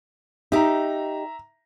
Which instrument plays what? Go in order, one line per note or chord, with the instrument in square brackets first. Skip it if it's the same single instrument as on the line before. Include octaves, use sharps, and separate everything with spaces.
[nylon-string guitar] D#4 G4 [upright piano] E5 A#5